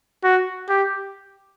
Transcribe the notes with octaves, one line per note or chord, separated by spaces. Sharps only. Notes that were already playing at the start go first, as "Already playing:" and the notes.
F#4
G4